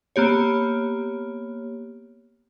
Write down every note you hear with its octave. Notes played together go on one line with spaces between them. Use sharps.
A#3 B3 G4 C#5